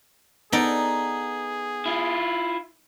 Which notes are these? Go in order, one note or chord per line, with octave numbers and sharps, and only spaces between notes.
B3 D#4 G#4 A4 D5
E4 F4